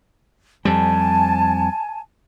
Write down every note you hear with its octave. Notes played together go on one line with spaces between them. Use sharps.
F2 G3 G#5 A5